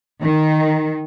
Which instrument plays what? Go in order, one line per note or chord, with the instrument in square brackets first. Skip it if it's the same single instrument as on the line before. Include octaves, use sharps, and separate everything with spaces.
[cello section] D#3